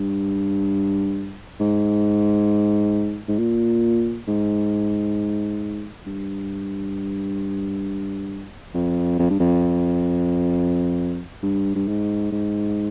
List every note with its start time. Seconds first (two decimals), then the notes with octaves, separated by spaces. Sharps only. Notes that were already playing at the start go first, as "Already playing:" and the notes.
Already playing: G2
1.60 G#2
3.28 G#2
3.39 A#2
4.28 G#2
6.07 G2
8.74 F2
9.19 F2
9.30 G2
9.40 F2
11.43 G2
11.75 G2
11.88 G#2
12.32 G#2